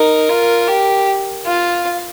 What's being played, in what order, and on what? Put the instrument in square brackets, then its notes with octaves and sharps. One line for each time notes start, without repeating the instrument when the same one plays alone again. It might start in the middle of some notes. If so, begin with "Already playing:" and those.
Already playing: [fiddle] D#4 [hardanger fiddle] A#4
[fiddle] F4
G4
[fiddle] F4 [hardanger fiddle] F5